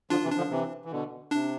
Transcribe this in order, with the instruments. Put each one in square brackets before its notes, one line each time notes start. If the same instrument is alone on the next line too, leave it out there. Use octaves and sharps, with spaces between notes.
[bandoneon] D3 F3 [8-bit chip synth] D4 F4
[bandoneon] C3 E3
[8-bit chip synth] D4
[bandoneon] D3 F3
C3 E3
E3
B2 D3
[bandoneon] C3 [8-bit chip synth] D4